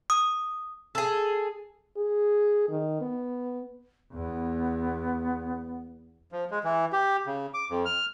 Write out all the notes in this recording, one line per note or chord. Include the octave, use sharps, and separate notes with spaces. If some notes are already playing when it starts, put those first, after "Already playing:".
D#6
G#4 A4
G#4
D#3
B3
E2 B3
F3
G#3
E3
G4
C#3
D6
F2
F6